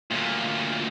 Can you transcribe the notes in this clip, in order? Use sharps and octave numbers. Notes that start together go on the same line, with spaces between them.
D2 A#2